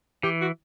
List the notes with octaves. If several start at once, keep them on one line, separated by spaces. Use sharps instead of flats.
E3 G4
F#4